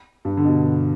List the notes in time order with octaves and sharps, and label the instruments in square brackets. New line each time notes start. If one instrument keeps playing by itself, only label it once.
[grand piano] G2
D3
B2